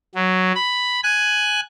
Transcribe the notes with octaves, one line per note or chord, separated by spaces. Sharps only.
F#3
B5
G#5 F#6